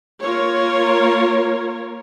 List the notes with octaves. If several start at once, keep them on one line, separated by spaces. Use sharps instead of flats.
A#3 F4 A#4 C#5